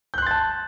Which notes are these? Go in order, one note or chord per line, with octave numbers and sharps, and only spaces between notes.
A5 C6 F#6 G6 A6